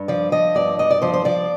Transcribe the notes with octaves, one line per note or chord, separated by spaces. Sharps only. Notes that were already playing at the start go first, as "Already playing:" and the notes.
Already playing: G2
F3 D5
F3 D#5
G2 D5
G2 D#5
D5
F3 C5
C5
F3 D5